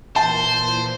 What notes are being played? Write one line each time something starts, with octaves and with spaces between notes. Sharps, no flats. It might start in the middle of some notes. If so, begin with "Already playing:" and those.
A#2 E3 A#3 C5 A5